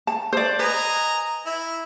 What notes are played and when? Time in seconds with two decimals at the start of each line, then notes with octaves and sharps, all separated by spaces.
0.07 A5
0.33 C5 D5
0.59 B4 D#5 G#5 A#5
1.46 E4